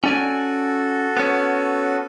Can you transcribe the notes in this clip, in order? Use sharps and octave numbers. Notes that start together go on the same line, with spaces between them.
C#4 F#4 A4 D5 G#5
B3 C#4